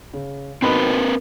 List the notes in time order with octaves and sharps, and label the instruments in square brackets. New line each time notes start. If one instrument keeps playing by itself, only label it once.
[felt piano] C#3
[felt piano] B2 D#4 B5 [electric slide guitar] C4 A#4 B4